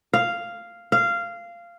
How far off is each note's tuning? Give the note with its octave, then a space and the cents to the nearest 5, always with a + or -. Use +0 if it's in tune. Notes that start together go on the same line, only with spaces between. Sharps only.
F5 -5
F5 -15